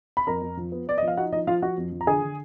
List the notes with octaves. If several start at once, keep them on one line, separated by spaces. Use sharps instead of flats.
B5
F2 A#4 A#5
F2
F3
B3
B3 D5
D#5
F3
F5
D#4 F#4 F#5
F3 D#4 D#5
F3 F4 F5
F3 F#4 F#5
F2
F3
A#5
D3 G#4 G#5
D3